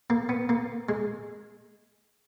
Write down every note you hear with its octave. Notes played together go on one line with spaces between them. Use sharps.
A#3
B3
A#3
G#3